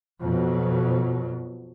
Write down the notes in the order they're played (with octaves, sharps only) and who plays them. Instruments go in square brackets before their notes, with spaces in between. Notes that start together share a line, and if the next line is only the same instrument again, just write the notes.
[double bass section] F2 B2 F#3